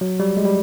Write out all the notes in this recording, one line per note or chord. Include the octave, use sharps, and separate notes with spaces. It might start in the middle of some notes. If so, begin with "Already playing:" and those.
F#3
G3
G#3
G3